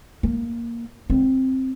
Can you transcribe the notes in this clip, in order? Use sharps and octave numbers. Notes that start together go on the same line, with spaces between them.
A#3
C4